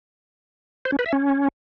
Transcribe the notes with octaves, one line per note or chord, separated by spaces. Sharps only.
C5
C#4
B4
E5
C#4